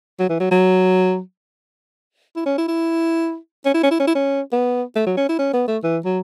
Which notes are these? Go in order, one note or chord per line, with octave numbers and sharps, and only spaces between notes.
F#3
E3
F#3
F#3
E4
C#4
E4
E4
C#4
E4
C#4
E4
C#4
E4
C#4
B3
A3
F#3
C#4
E4
C#4
B3
A3
E3
F#3